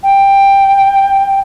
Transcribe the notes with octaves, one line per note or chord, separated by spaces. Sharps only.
G5